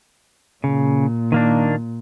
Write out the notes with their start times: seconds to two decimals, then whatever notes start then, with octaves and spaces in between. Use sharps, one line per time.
0.64 A#2 C#3
1.32 D#3 A#3 D4